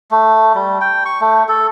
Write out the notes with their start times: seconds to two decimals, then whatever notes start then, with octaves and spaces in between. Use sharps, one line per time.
0.11 A3
0.55 G3
0.81 G5
1.05 C#6
1.21 A3
1.49 A4